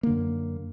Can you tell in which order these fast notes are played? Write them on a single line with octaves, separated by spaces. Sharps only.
A#3 D3 F#2